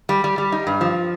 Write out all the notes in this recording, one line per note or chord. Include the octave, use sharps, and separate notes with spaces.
G3
G3
G3
D#4
G2
F3